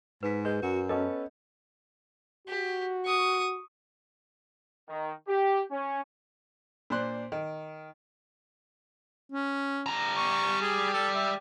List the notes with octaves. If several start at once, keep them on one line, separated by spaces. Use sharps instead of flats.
G#2 B4 B6
G#3 B4 G6
F#2 F#4
B3 C#4 A4 D#5
F#4 G4
C#6 D#6
D#3
G4
C#4
A#2 D4 C5 C6 F#6
D#3
C#4
G3 A#5
C#6
G#4
A4
E5